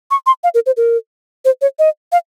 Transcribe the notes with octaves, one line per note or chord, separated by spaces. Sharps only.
C#6
C6
F5
A#4
C5
A#4
C5
C#5
D#5
F5